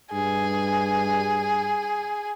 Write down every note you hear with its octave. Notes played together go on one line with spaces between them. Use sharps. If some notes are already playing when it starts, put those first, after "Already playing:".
G2 G#4